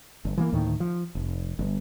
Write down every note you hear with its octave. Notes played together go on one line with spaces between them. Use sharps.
G1
E3 F3 A#3
D2 A2 D#3
F3
F1
G1